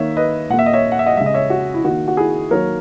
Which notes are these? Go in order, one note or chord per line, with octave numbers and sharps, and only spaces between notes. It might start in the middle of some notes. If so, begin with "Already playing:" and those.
Already playing: D#3 A#3 C#5 E5
B4 D#5
A#2 A#3 E5 F#5
D#5
C#5 E5
F#5
E5
D#5 F#5
C#3 G#3 E5
D#5
C#5 E5
F#4
E4
D#3 A#3 F#4
F#4
E4 G#4
D#3 F#3 A#3 A#4 C#5